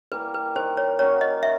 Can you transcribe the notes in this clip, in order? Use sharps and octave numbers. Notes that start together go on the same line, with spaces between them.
E3 G3 A#3 B4
B4
D#3 C5
C#5
F#3 A#3 C#4 C#5
D#5
D#3 E5